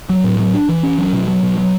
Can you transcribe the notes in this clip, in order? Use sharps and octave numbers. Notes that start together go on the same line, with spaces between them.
F#3
A2
F#3
D4
E3
C#4
F#3
B2
F#3
B2
F#3